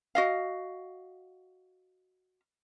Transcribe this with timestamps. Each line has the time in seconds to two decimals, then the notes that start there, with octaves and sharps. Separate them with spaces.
0.15 F#4 D#5 F5